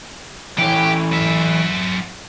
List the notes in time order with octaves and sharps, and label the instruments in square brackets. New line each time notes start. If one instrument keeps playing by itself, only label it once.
[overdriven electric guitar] E3 C#4 [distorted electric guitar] G4 G5
[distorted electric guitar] F#3 E5